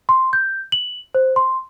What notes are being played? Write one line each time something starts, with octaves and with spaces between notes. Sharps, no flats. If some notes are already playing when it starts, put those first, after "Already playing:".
C6
G6
F#7
C5
C6